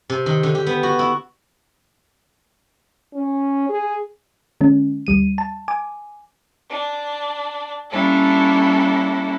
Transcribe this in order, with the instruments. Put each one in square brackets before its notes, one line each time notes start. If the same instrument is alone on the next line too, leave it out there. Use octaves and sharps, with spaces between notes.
[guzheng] C3
D#3
D3
G4
B3
F#4
E4
[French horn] C#4
G#4
[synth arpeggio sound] D3 G#3 C#4
D2 G3 D#7
A5
G#5 D6
[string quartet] D4
G3 A#3 C#4 D4 E4 A4